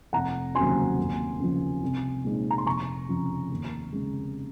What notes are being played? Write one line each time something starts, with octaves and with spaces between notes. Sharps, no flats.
F1 F#5 A#5
D#2 C#3 F#3 C4 G#5 C6
D#2
C#3 F3
C2
A#2 G#3 C4 D#4
A#5
C6
F1 A#5 C#6
F2 C#3 F3
D#2
C#3 G#3